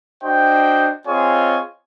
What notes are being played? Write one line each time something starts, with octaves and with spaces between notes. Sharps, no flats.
D4 F#4 C5 D#5 G5
C4 F4 G#4 C#5 D#5 G#5